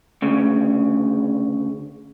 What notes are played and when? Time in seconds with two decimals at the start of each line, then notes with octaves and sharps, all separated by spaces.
0.22 D2 C#3